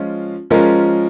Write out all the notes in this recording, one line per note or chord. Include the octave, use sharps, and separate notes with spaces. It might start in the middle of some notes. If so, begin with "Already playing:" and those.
Already playing: F3 G#3 C#4 F4
F3 G#3 C#4 F4 A#4